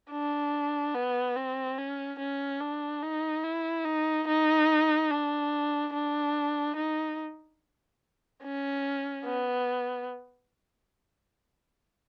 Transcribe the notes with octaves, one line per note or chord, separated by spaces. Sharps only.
D4
B3
C4
C#4
C#4
D4
D#4
E4
D#4
D#4
D4
D4
D#4
C#4
B3